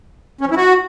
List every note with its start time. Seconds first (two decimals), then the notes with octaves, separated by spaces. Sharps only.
0.41 C#4
0.46 F3
0.51 E4
0.57 F#4